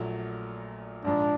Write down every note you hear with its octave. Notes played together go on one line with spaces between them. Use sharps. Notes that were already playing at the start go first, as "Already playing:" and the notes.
Already playing: A#1 A#2 F#3 A3
A#1 G#2 F3 D4